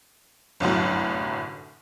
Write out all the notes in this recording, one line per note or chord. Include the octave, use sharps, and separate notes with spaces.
G1 C2 F#2 A2